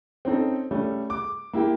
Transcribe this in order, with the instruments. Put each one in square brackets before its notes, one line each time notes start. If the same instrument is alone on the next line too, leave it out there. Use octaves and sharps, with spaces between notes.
[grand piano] C4 C#4 D#4 A4
G3 A3 C#4
D6
A#3 E4 G4 G5